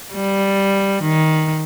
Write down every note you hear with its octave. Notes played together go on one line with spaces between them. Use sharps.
G3
D#3